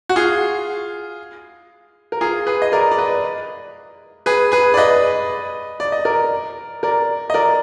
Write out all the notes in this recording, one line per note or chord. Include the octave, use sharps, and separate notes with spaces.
F#4
F4 G#4
A#4
F4 G#4
G#4 B4
D#5
A#4 D5
D5
B4 D#5
G#4 B4
G#4 B4
D5
B4 D#5
D5
D#5
A#4 D5
A#4 D5
D#5
A#4 D5